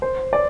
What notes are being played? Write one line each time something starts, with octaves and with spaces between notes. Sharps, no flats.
C5
D5